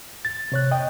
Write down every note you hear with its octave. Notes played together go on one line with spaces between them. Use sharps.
A6
C3 C#5 F#6
D#5 G5